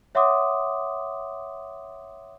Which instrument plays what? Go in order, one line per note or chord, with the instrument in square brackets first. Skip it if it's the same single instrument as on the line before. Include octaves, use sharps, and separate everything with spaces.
[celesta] C#5 E5 F#5 C6 D6 D#6